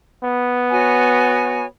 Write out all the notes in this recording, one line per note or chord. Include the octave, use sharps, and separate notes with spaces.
B3
F#4 C#5 G#5